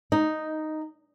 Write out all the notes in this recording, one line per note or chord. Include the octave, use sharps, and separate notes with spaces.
D#4